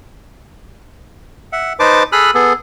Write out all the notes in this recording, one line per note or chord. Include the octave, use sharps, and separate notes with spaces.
E5 F#5
D#4 B4 C5 A5 D6
G#4 A4 B5 D#6 F6 F#6
B3 G#4 A4